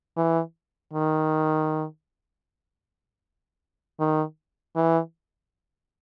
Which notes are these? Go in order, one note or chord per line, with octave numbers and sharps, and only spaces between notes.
E3
D#3
D#3
E3